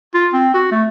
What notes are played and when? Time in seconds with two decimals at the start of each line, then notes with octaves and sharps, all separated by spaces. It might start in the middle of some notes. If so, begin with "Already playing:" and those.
0.14 F4
0.33 C4
0.54 F#4
0.72 A3